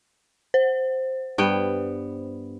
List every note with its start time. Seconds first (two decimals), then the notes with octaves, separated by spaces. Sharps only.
0.54 C5
1.38 G2 B3 G5